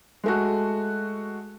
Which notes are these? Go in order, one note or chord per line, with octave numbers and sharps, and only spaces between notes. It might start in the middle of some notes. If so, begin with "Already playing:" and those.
G#3 A3 F#4